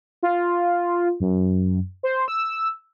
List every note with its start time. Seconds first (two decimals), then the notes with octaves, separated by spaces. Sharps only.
0.23 F4
1.20 F#2
2.03 C5
2.28 E6